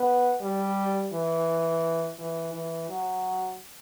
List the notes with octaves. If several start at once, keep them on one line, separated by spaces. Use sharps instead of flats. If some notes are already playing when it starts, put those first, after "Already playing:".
Already playing: B3
G3
E3
E3
E3
F#3